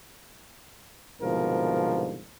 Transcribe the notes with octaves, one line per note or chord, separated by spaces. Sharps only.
C2 G#2 B2 D3 F3 A#4